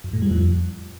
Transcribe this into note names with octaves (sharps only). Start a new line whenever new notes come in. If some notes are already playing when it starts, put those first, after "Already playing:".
F#2
A2
G3
F2